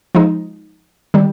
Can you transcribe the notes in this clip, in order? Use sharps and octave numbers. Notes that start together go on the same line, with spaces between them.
F3 G#3 D#4
D#3 G3